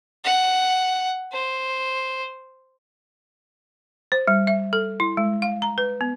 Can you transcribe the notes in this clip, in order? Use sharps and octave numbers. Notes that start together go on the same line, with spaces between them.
F#5
C5
C5
G3
E5
A4
E4
G#3
F5
A#5
B4
B3